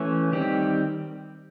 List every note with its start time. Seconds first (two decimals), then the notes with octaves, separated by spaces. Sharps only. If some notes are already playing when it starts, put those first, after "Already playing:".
Already playing: E3 A3 C#4
0.32 D#3 G3 C4 G4